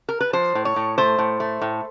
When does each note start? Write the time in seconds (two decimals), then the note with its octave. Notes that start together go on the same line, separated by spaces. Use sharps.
0.09 A#4
0.21 B4
0.33 F3 C5
0.55 A2
0.65 C#5
0.76 A2
0.98 A3 C5
1.18 A2
1.40 A3
1.62 A2